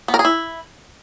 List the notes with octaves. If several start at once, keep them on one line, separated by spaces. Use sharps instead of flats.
B3
A#4
G#4
E4